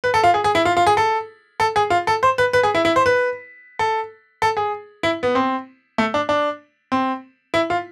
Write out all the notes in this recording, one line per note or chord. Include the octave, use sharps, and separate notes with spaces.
B4
A4
F4
G#4
G#4
E4
F4
F4
G#4
A4
A4
G#4
F4
A4
C5
B4
B4
G#4
E4
E4
C5
B4
A4
A4
G#4
E4
B3
C4
A3
D4
D4
C4
E4
F4